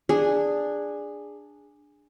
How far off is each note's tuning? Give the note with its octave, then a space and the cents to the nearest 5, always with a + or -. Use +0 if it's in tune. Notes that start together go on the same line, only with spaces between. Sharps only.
D4 +5 G#4 -10